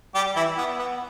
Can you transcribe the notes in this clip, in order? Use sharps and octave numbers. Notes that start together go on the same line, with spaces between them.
G3 G4
E3 E4
B3
B3